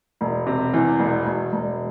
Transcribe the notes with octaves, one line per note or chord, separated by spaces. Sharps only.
E1
C3
E2
E1
E1
E1